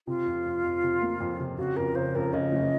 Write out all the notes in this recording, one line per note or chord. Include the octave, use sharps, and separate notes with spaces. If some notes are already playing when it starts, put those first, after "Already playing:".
C3 F4
F2
F2
F2
C3
A#3
F2
C3
C#3 F#4
F2 A#4
C#3 C5
F2 A#4
C#3 D#5
F#1